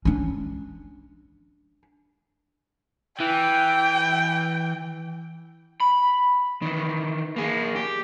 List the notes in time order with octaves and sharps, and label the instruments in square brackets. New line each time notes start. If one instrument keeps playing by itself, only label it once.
[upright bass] C#4 D4
[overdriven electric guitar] E3 [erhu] G5
[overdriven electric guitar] B5
D#3 E3
A#3 G#4
G4